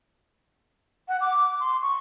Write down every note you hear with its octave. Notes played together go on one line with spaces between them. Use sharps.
F#5
D6
C6
C#6